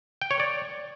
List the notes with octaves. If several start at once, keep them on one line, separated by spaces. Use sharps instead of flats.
G5
C#5
D5